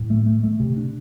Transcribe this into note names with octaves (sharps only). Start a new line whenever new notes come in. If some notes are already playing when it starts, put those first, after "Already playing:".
Already playing: A2
A3
A3
A3
C3
D4